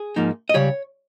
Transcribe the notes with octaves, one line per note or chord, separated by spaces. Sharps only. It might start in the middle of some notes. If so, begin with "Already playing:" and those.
Already playing: G#4
G#2 F3 A#3 D#4
D#5
C#2 C#3 G3 C#5